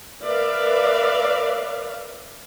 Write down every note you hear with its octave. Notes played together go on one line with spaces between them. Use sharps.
A#4 B4 D5 E5 F5